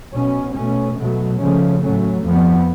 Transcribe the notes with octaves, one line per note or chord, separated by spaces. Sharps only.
B2 F#3 C#4
B2 A3 C#4
B2 F#3 A3
C#3 F3 A3 C#4
A2 F#3 A3 C#4
F2 F3 B3